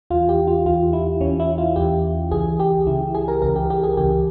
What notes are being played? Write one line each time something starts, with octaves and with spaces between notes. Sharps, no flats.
E2 E3 F4
G4
F4
E2 E3 F4
E4
E2 E3 C#4
E4
F4
E2 E3 G4
C#2 C#3 E3 G#4
G4
C#2 C#3 E3 E4
G#4
A#4
C#2 C#3 E3 A#4
G4
G4
G#4
C#2 C#3 E3 G4